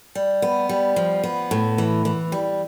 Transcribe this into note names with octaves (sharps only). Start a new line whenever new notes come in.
G3
B3
G3
F3
B3
A2
E3
E3
G3